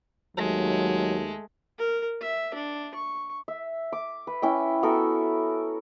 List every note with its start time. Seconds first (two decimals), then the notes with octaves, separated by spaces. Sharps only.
0.37 D#2 F#3 G#3 A3
1.78 A#4
2.21 E5
2.54 D4
2.95 C#6
3.48 E5
3.92 D6
4.27 B4
4.42 C#4 E4 G5
4.83 B3 F#4 A4 A#4